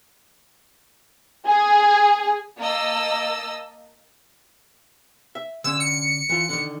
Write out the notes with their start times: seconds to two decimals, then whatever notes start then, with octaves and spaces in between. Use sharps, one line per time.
1.46 G#4
2.60 A#3 D#5 A5 E6
5.35 E5
5.64 D3 C#4 E6
5.80 C#7
6.29 E3 F4
6.49 D3 D#3